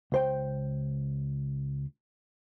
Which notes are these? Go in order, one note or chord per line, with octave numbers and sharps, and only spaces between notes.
C#2 C5 G5